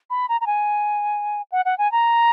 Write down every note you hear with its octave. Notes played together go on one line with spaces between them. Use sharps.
B5
A#5
A#5
G#5
F#5
F#5
G#5
A#5